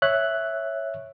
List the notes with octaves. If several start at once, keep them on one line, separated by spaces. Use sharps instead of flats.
C#5 E5 F#6